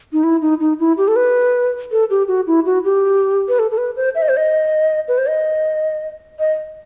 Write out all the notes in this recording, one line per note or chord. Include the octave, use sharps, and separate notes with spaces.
D#4
E4
D#4
D#4
E4
G4
A4
B4
A4
G4
F#4
E4
F#4
G4
B4
A4
A4
B4
C5
E5
D#5
C5
D#5
B4
C5
D#5
D#5